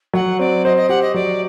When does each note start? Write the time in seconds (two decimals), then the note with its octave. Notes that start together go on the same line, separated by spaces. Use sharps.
0.13 F#3 F#5
0.39 C4 D5
0.65 C5 D#5
0.76 D#5
0.89 G4 F#5
1.02 D#5
1.14 F#3 D5